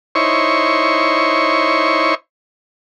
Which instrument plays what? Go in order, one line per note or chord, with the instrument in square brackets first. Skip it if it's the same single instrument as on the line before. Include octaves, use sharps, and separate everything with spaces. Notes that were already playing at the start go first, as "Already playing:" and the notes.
[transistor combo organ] D#4 E4 C5 C#5 C#6